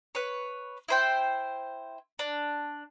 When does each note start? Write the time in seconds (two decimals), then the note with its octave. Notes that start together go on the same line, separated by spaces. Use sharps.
0.15 B4 C#5
0.88 E4 C5 G5
2.19 D4